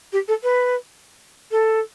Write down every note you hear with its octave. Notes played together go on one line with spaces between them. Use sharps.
G4
A4
B4
A4